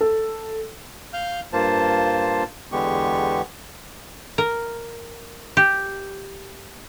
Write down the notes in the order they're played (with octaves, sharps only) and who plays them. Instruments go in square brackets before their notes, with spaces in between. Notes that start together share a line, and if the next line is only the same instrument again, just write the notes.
[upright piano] A4
[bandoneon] F5 F6 G6
G2 A#3 F4 C5 A5
E2 D3 G#3 B3 G4 C#6
[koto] A#4
G4